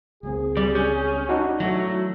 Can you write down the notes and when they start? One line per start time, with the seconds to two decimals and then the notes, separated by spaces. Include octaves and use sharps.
0.23 C#2 F#3 C4 G#4
0.57 G3 D5
0.75 C#4 G6
1.29 D4 D#4 F#4
1.60 E3 F#3 A3